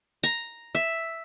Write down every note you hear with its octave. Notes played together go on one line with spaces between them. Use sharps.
A#5
E5